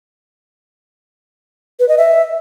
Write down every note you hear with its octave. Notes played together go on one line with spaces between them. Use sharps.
B4
D#5
E5